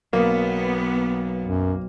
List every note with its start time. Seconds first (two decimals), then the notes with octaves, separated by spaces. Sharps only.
0.13 B1 A#3 B3
1.45 F#2